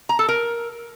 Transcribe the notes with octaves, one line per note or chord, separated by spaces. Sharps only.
A#5
A4
A#4